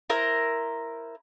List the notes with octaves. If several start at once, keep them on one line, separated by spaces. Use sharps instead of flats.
E4 A#4 C5 A#5